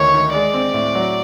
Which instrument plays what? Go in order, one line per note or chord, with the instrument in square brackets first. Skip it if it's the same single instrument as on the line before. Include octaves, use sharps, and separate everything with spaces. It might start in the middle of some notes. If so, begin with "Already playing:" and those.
Already playing: [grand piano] D2 D3 D#3 [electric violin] C#5
[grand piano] D#3
[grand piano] G#3 [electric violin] D5
[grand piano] C4
A2
F#3